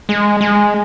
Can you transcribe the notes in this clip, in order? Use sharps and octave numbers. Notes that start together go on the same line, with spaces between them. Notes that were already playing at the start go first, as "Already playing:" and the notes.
G#3
G#3